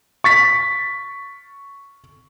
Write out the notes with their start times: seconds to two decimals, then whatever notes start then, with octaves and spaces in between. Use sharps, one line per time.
0.24 C#6 A6 B6